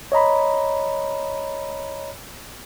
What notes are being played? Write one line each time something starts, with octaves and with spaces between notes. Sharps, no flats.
C#5 D#5 A#5 B5